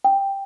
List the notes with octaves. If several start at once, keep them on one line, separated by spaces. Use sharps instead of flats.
G5